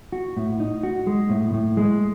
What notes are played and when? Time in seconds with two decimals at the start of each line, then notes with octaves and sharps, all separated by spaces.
0.12 F#4
0.37 A2
0.60 D#4
0.83 F#4
1.07 G#3
1.30 A2
1.54 A2
1.77 G#3